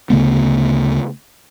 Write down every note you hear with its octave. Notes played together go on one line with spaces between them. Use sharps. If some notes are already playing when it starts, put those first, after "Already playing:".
D2 C#3 A3 B3